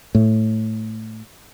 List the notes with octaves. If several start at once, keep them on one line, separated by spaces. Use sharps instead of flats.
A2